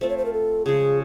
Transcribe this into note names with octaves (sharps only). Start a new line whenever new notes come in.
A3 C4 F4 C5
C#5
C5
A#4
A4
C#3 F3 G#3 G#4